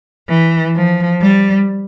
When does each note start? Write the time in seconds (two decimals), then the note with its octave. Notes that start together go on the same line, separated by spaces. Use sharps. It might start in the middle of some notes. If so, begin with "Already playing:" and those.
0.29 E3
0.75 F3
1.21 G3